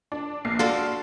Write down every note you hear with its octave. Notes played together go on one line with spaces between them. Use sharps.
D4
A#1 A#2 C7
D4 F#4 A4 F5 C6